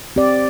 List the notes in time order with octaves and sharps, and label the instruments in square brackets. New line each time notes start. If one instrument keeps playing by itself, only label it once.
[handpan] C4 G4 D5